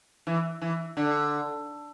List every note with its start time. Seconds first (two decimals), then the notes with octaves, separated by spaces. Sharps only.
0.27 E3
0.62 E3
0.97 D3